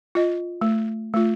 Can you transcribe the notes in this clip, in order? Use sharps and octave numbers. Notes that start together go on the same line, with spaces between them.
F4 D#5
A3
A3 F4